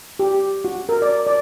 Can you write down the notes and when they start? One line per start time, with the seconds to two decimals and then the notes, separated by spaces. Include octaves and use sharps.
0.19 G4
0.65 F#4
0.89 A#4
1.02 D5
1.27 D5